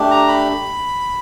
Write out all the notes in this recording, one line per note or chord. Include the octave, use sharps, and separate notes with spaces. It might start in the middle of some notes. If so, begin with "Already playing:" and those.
Already playing: A3 D4 G4
A#5
B5